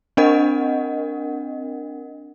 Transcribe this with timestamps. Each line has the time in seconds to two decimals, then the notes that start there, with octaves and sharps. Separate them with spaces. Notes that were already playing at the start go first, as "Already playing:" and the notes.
0.17 C4 D4 A#4 D#5 F#5